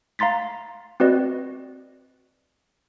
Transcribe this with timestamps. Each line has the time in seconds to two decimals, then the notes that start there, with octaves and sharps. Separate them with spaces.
0.19 F5 A#5 C6 A6 B6
1.00 C4 F#4 B4 D5 D#5